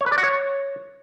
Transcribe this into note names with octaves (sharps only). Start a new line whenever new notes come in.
C#5
B4
D5
F#4
C#5